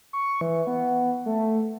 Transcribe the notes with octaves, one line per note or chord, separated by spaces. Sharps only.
C#6
E3
B3
A3